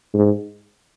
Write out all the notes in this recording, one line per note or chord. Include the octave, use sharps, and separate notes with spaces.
G#2